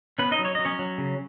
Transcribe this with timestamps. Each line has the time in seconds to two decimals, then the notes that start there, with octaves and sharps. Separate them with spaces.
0.19 B3 C#4 B4
0.31 D#4 D#5
0.39 F#3
0.45 C#5
0.55 F#3 D#5
0.65 C#4 C#5
0.79 F#3
0.98 C#3